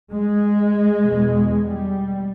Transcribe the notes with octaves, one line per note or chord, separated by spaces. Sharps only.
G#3
E2 B2
G3